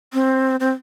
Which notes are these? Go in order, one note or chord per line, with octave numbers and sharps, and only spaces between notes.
C4
C4